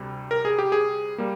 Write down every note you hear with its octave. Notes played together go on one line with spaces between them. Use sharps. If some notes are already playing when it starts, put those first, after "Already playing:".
Already playing: D2 C3 G3
A#4
G#4
G4
G#4
G3 A#3